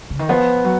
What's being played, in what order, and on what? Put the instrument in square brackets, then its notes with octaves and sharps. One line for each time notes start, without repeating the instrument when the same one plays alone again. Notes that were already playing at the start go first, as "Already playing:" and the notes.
[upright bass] C#3
D#3
[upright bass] F3 [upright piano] B3
[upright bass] F#3